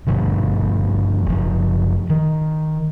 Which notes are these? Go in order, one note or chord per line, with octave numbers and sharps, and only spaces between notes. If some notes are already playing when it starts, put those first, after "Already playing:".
G2 B2 F3 A3
F#1 F3
D#3